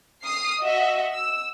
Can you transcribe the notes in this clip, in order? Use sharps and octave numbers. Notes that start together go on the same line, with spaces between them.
D#6 F6 C7
F#4 D#5 E5
E6